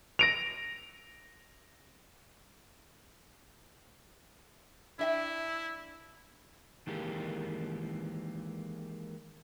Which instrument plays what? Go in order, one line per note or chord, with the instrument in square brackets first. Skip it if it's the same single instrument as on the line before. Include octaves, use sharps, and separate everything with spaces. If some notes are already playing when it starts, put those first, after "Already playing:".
[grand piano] A#6 D7 F7
[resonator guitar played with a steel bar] D4 E5 G5 [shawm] E4
[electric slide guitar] D#3 E3 G#3 A#3 G4